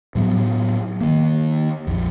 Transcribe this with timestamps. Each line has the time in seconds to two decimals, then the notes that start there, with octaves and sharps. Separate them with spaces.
0.15 A2 F#3 B3
1.01 D#3 A#3
1.87 A#1 F2